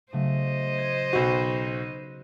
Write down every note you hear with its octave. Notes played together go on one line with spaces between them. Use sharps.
C#3 F#3 A3 C5 D#5
G#6
B1 F#4
F#6